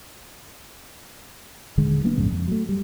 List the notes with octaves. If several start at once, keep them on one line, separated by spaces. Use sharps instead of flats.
D#1 D3 D#3 G#3
F#3 A#3 B3 D4
A#1 F2 G#2 C#3
F2
F#3 A3
G3